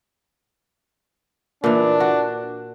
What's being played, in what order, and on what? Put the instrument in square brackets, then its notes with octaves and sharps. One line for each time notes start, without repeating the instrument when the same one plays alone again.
[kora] A#2 E3 [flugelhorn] D4
[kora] F#4